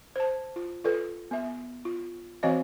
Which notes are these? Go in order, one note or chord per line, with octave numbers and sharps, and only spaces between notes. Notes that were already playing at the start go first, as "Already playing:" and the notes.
C5 A5
F4
F4 A4 B4
B3 E5
F4
E3 C4 F#4 C#5 D#5 F5